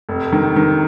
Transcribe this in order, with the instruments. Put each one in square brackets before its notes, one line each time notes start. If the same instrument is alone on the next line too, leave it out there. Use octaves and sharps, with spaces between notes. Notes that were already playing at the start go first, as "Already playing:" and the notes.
[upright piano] F1
D#3
D#3